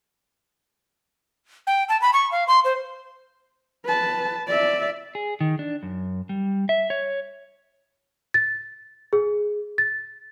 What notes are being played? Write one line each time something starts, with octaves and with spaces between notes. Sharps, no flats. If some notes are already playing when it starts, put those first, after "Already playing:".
G5
A5
B5
C#6
F5
C6
C5
B4 A5
D5 E5
G#4
D#3
D4
F#2
G3
E5
C#5
A6
G#4
A6